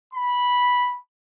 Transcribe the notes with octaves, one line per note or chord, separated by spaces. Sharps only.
B5